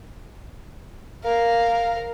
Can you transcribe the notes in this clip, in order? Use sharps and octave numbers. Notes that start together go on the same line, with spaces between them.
A#4 F5